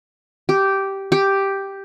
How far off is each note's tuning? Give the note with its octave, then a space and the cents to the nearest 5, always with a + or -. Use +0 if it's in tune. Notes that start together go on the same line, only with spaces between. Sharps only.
G4 -10
G4 +0